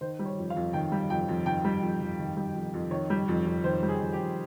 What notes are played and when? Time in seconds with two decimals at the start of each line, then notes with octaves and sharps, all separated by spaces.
0.01 D#3 C5
0.19 G3
0.26 C#5
0.38 F2
0.50 F5
0.56 F2
0.73 D#3 G5
0.92 G3
1.10 F2 G5
1.28 F2
1.46 D#3 G5
1.64 G3
1.82 F2
2.01 F2
2.19 D#3
2.37 G3
2.55 F2
2.74 F2
2.91 D#3 C#5
3.10 G3
3.28 F2
3.46 F2
3.64 D#3 C5
3.83 G3
3.89 G#4
4.00 F2
4.13 G4
4.18 F2